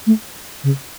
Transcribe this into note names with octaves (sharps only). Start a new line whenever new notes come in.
A3
C#3